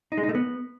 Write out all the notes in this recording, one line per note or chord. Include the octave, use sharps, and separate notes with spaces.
D#4
G#3
D#4
A3
B3